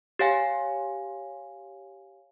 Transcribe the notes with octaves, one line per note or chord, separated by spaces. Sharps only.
G4 C#5 F5 G#5